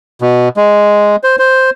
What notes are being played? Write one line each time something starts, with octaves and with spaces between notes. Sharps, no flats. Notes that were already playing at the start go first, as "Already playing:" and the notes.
B2
G#3
C5
C5